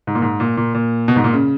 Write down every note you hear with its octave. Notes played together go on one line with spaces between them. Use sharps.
G#2
A#2
G#2
A#2
A#2
A#2
B2
G#2
A#2
C#3